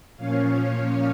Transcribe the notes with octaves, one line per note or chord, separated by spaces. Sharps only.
A#2 F3 A#3 C#4 C#5 F5